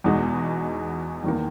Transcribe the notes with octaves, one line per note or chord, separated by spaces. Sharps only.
E2 B2 G#3 D#4 F#4
E2 D#3 A#3